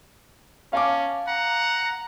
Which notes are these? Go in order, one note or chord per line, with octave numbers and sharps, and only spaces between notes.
C#4 F5 A5 D6
F#5 A#5